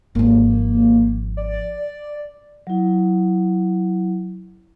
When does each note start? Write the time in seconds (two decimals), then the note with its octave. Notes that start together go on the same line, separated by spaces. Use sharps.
0.15 G#1 F3 A#3
1.37 D5
2.67 F#3 E4